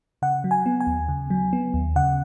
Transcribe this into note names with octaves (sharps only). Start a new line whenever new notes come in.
C#3 F#5
F#3
G#5
B3
G#5
D#2
C#3
F#3
B3
D#2
C#3 F#5